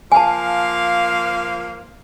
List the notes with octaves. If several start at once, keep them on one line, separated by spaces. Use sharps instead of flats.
F3 A#3 F5 G#5 A5